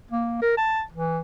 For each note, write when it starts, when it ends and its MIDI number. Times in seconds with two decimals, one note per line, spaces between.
0.11 0.38 58
0.42 0.57 70
0.58 0.83 81
0.92 1.21 52